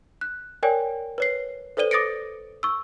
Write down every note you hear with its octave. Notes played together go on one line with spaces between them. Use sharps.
F#6
A#4 C#5 D5 G5 G#5
B4 C#5 C7
A4 B4 C5 D5 D#7 G7
D6 D#6 A6 A#6 C#7 D7
C#6 E6